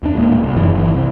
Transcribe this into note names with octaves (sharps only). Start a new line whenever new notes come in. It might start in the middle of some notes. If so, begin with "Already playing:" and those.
E2 D4
D#1 A2 G#3 A#3
C2
F1 F#2 D#3 E3
G1 E3
C2